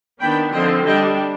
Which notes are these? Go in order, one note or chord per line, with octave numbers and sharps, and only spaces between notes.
D#3 B3 D4 G5 B5
D3 F3 C4 D#5 G5
G3 D4 D#5 G5